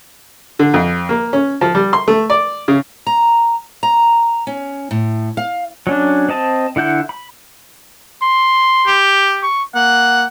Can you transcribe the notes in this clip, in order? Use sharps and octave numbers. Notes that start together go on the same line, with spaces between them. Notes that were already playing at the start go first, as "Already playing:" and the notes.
D3
F2
A#3
C#4
F3
G3
C6
A3
D5
C#3
A#5
A#5
C#4
A2
F5
F#3 C#4 D4
C4 D#5 A5
D3 E4 F#5 G6
B5
C6
G4
C#6
A#3 F#5